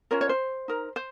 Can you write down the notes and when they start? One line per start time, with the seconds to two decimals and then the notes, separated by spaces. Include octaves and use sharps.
0.11 C#4 F4 A#4 C#5
0.21 C#5
0.29 C5
0.68 D#4 A#4
0.96 C5